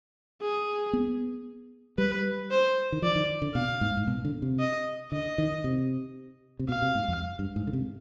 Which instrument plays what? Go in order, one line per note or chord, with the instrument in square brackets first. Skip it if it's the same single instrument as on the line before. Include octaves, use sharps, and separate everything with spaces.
[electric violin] G#4
[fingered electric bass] B3
[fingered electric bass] G3 [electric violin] B4
[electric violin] C5
[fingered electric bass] D#3
[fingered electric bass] F3 [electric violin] D5
[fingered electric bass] D#3
D3
[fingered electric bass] B2 [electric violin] F5
[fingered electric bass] G#2
G#2
B2
D3
C3
[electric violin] D#5
[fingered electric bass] D3 [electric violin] D#5
[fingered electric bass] D#3
C3
C3
[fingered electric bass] B2 [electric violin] F5
[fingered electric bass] C3
G#2
F2
G2
G#2
D3
C3